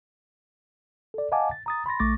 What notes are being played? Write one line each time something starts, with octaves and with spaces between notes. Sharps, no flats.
A4 D5
D#5 F5 F#5 G#5 A5 D6
A6
A#5 D#6 A6
B5 C6 A6 A#6
A#1 A3 C#6 D6 A6 A#6